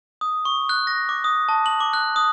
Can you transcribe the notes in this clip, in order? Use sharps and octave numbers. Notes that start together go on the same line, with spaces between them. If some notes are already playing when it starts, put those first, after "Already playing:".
D#6
C#6
F#6
A#6
D6
D#6
A5
F#7
D6
F#6
D#6